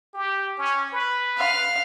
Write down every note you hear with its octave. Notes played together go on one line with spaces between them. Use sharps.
G4
C#4
B4
F5